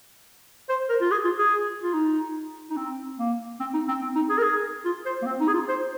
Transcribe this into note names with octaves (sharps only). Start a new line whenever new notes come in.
C5
A#4
F4
G#4
F4
G#4
F4
D#4
D#4
C4
A#3
C4
D#4
C4
C4
D#4
G#4
A#4
G#4
F4
C5
A#3
C4
D#4
G#4
F4
C5